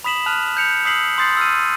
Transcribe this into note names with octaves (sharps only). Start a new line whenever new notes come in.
B5 D#6 B6 E7 F#7
A5 F6 F#6 F7
G6 C#7 F7
D#6 E6 B6 C7 F#7
C6 D#6 G6 A6 C7
E6 F6 D#7